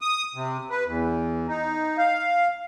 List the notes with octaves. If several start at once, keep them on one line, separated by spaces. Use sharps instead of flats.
D#6
C3
B4
E2
D#4
F5